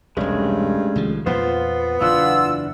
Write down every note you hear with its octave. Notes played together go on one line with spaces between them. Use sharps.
E1 C2 G2 G#3 A3 C#4
C2 D#3 F3
E2 A#2 B3 F4 C5
F#1 E2 E3 D4 F4 F#5 E6